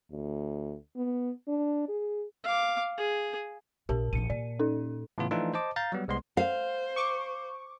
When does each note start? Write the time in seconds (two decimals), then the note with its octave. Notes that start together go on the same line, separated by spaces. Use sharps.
0.11 D2
0.96 B3
1.48 D4
1.88 G#4
2.44 F5 D6
2.98 G#4
3.89 A#1 G4 A#4 A5
4.13 A#1 F3 C#7 D#7
4.30 A#2 D5
4.59 C#4 D#4 A4
5.18 A2 C#3 E3 B3 F4
5.31 E3 F3 A3 D4 D#4 F4
5.54 C5 D#5 A5 D6
5.76 F5 A#5 G6 A6
5.92 F#3 G3 B3
6.08 C2 G#3 B3 C6
6.37 C5 F5
6.96 C#6 D6